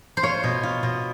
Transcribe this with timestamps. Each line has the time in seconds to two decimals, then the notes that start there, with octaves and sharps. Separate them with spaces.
0.17 C5
0.23 F4 C#5
0.44 B2
0.63 F4
0.83 B2